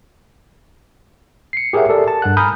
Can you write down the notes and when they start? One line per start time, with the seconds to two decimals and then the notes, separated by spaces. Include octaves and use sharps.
1.53 C7 C#7
1.73 G4 G#4 A#4 C#5 E5 F#5
1.89 G4 A4 A#4 D5
2.08 A5
2.22 G2 F#5 F#6
2.37 G#5 A#5 B5 D#6 F6 G6